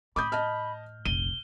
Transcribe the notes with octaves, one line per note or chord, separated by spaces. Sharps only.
A2 B5 D6 D#6 G6
D#5 A5 F6
F1 A#1 D#7 G7